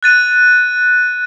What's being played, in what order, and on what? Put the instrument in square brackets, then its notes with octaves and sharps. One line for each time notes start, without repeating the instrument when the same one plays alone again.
[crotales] F#6 A6 D#7